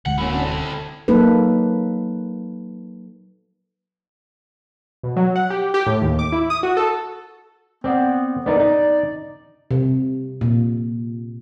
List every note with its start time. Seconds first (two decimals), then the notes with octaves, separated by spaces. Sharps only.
0.06 D1 D3 G#3 F#5
0.18 A#3 C4 C#4 E4 F#4
0.32 C#4 D4 F#4
0.43 A4
1.08 F#3 A#3 D#4 A4 B4
5.03 B2
5.16 F#3
5.36 F#5
5.50 G4
5.74 G4
5.87 A2
6.02 D#2
6.19 D6
6.32 E4
6.50 D#6
6.63 F#4
6.77 A4
7.84 B3 C4 D5
8.46 B3 D#4 A#4 D5
8.60 D#4
9.71 C3
10.41 A#2